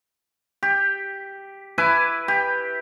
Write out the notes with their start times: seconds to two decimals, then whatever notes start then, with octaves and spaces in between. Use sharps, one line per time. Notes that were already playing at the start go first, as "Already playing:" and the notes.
0.63 G4
1.78 E4 B4 G#5 D6
2.28 G4